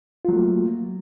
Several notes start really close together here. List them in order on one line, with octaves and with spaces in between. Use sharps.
F4 F#3 A3 A#3